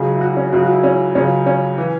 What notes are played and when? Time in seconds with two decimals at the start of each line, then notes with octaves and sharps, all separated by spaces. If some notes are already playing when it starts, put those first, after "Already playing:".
Already playing: C#2 C#3 F#3 G#4
0.15 E4
0.21 F#4
0.37 C#4
0.52 C#2 C#3 F#3 F#4
0.63 F#4
0.73 E4
0.84 C#4
1.15 C#2 C#3 F#3 C#4
1.46 C#4
1.78 E3